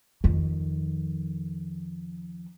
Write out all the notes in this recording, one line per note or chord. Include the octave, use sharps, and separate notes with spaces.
F2 D#3